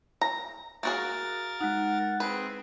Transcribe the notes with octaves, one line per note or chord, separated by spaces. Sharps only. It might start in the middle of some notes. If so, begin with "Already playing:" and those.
A#5
A#3 F#4 G#4 A#4 A6
G#3 D#4 F#5
C4 G#4 B4